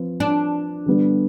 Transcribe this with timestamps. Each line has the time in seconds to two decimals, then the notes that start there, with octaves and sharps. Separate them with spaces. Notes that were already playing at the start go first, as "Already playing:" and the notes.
Already playing: F3 C4 F4 B4
0.20 D4
0.86 D3 G3 B3